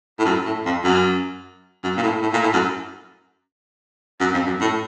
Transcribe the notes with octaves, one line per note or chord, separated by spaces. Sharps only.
A2
F#2
A2
F2
F#2
F#2
A#2
A2
A2
A#2
A2
F#2
F#2
F2
F#2
A2